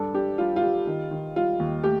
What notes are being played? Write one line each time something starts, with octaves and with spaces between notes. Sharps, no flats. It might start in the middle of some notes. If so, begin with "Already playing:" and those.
Already playing: G2 D4 A4
D4 G4
G3 F4
F4
G3
D#3
D#3
G3 F4
D#2
A3 G4